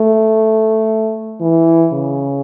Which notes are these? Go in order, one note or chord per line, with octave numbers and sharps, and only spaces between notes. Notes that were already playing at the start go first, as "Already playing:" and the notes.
Already playing: A3
E3
C#3